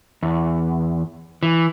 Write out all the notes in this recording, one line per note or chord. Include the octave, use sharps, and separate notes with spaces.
E2
E3